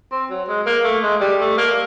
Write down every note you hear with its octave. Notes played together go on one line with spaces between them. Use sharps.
C4
F#3
G#3
A#3
A3
G#3
G3
A3
A#3